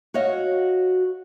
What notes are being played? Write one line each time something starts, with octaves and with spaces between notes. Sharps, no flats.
F#4 C#5 D#5 F5